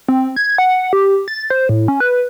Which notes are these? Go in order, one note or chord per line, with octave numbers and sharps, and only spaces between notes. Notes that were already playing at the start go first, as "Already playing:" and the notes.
C4
G#6
F#5
G4
A6
C5
A2
C#4
B4